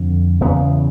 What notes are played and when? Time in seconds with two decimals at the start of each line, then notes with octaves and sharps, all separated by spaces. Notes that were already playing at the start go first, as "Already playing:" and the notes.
Already playing: F2 D3
0.41 E2 C#3 B3